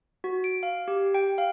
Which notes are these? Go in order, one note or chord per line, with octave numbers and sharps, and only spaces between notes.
F#4
D7
F5
G4
G5
F5